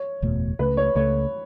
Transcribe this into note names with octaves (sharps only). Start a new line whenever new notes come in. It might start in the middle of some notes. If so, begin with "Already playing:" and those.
Already playing: C#5
F#1 E2 B2 A3
C#2 C#3 A3 B4
C#5
C#2 C#3 A3 C#5